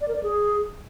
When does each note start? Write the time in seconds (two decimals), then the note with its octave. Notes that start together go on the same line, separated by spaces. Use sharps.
0.01 D5
0.08 A#4
0.16 D5
0.23 G#4